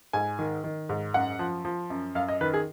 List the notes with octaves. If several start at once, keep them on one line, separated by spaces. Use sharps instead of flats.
G#2 G#5
D#3
D#3
G#2
F#2 F#5
F3
F3
F#2
F#2 F5
D#5
D#3 B4
G#4